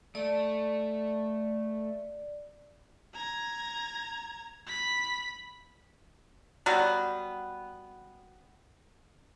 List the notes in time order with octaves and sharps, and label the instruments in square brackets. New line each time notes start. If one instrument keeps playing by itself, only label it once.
[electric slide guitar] A3 [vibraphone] D5
[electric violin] A#5 G#6
B5 B6
[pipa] F#3 G3 B3